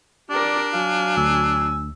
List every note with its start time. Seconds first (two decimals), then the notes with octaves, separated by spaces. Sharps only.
0.30 D4 G4 A#4 D5
0.73 F#3 F5 G#5
1.17 D2 E6